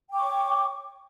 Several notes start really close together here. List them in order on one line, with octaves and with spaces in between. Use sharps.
G5 D6 C#6 C#5